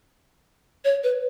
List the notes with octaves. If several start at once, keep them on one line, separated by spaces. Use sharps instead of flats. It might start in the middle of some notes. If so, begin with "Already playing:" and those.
C#5
B4